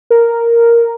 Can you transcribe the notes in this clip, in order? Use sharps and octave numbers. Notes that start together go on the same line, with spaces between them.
A#4